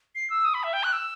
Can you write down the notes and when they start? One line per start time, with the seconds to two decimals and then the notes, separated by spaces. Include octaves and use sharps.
0.15 C7
0.30 E6
0.45 D#6
0.54 B5
0.63 E5
0.73 G5
0.84 F#6
0.93 E6